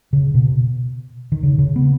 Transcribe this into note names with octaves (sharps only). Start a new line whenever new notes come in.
C#3
B2
D#3
C#3
C#3
B3